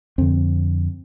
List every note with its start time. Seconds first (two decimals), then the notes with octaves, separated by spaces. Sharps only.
0.18 F2 D3 C4